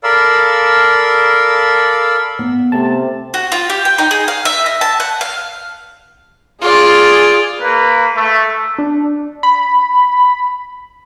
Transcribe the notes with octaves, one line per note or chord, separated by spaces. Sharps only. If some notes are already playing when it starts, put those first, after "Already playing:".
A4 A#4 D5 F5 B5 E6
B3
C3 A3 A5
F#4
F4
G4
G5
D#4
G#4
F5
E5
D#5
A5
F#5
F5
F4 G#4 D5
A#3 B4
A3
D4
B5